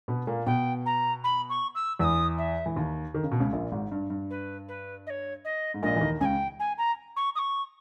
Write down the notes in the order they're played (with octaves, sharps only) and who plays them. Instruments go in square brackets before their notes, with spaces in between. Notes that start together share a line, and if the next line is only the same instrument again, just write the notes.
[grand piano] B2 B3
A#2 A#3
[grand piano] B2 B3 [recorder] G5
[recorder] A#5
B5
C#6
E6
[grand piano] E2 E3 [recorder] D#6 E6
[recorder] E5
[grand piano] E3
D#2 D#3
D#3
C#3
B2
C#2 C#3
A#1 A#2
G#1 G#2
G2
G2
[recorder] B4
B4
D#5
C#5
D#5
[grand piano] G#2
[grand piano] A#1 A#2 [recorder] D#5
[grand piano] E3
D#2 D#3
[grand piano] C#2 C#3 [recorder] G5 G#5
[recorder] G#5
A#5
C#6
D#6
C#6